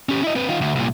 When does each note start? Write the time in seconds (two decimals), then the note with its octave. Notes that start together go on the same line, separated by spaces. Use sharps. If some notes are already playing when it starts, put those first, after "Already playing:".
0.09 C#4 G4
0.23 E4 D#5
0.36 C4 B4
0.49 D#3 F4
0.61 D2
0.75 C2 A#2